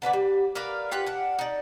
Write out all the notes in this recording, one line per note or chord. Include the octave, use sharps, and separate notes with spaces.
D3 B3 B4 D5
G3
A#4 B4 D5 F5
F4 G4 B4 F#5
D4 F#5
D#4 D5